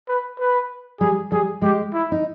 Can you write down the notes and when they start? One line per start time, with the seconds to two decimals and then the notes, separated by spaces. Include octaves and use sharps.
0.08 B4
0.39 B4
1.00 G3 G#4
1.32 G3 G#4
1.62 G#3 G4
1.93 E4
2.12 D#4